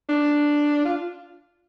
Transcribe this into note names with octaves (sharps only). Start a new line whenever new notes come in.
D4
F4